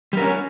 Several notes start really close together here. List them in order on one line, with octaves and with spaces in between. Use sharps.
G3 A#4 C#4